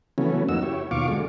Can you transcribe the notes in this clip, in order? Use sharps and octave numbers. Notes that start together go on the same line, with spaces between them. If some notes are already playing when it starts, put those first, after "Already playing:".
C#3 E3 F#3 A3 B3 C#4
F2 A#3 D#4 F#4 E6
E4 G4 C#5
D#2 B2 F4 F5 C#6 D6
D3 F#3 G#3 A3